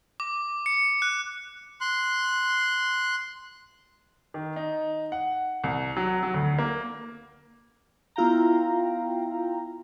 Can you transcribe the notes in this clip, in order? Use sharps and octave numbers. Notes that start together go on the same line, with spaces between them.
D6
C#7
F#6
C6 F#6
D#3
D#4
F#5
C2
F#3
F#3
D2
A#3
B3 E4 F4 F5 G5 A#5